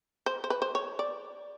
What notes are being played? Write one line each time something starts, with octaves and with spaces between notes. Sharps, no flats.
C5
C5
B4
C5
C#5
D5